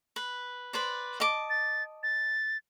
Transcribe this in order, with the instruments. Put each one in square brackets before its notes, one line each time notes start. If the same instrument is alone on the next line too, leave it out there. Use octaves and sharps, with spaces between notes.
[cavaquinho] B4
B4 C5 D5
D#5 A5 D6
[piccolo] A6
A6